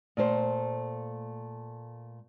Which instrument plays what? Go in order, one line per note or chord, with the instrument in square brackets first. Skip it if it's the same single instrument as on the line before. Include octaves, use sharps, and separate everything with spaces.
[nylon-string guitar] A#2 A3 C5